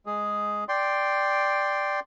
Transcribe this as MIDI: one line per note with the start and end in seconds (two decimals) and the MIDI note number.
0.06 0.64 56
0.06 0.64 68
0.69 2.00 74
0.69 2.00 79
0.69 2.00 84